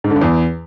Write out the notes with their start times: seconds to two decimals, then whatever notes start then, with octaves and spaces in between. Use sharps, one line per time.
0.04 G#2
0.10 D3
0.16 G2
0.22 E2